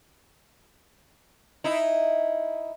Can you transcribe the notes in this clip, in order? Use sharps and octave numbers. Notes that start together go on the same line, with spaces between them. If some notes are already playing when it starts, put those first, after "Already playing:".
D#4 E4